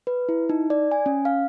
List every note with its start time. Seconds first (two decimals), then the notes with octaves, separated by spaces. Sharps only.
0.07 B4
0.29 E4
0.50 D#4
0.70 D5
0.91 G#5
1.06 C#4
1.25 F5